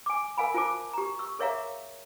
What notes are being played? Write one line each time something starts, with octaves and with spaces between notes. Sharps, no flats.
G#5 D6
A#4 F5 G#5 B5
F4 A#4 C5 G#5 A5 D6
G4 A#5
C#6 E6
G#4 A#4 C#5 E5 F5 A#5